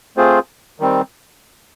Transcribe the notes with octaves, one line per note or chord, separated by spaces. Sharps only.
A3 C4 F4 G#4 C5
D#3 G3 C4